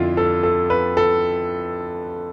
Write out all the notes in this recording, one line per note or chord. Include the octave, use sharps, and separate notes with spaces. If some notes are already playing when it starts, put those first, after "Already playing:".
Already playing: F2 D3 E4 F4
A4
A4
B4
A4